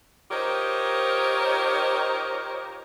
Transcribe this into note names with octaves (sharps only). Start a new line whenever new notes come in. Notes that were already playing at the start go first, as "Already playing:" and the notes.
D#4 F4 G4 A#4 C5 C#5